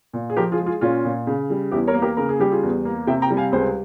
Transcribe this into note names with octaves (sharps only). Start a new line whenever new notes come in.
A#2
G#4
F3 G4 A#4
F4 G#4
G#3
F4 G#4
A#2 C#4 F4
A#2
C#3
G3
E2 E4 G4
A#4 C#5
A#3
G4 A#4
C#3 A#4
G#4
G3 G4
F4 G#4
E2
A#3
C3 E5 G5
G5 A#5
G3
F5 G#5
C#2 G#4 C5